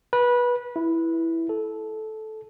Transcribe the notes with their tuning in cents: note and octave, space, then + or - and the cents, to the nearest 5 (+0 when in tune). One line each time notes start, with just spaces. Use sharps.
B4 -20
E4 +0
A4 -15